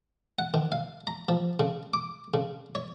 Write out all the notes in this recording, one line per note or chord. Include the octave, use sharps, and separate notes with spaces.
F#5
D#3
F5
A#5
F3
C#3
D6
C#3
C#5